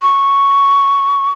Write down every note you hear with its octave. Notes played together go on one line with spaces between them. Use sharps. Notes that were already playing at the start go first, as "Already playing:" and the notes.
C#6